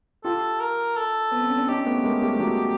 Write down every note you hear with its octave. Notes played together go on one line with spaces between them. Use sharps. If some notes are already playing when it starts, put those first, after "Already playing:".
F4 G4 A4
A#4
A4
B3
C4
C#4
D4
C#4 D#4 G4
A3 B3
G#3 A#3
G3 A3
A3
F#3 G#3